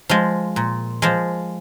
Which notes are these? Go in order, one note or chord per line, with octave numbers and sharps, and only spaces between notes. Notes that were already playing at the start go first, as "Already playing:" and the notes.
F3 G#3
A#2
F3 G#3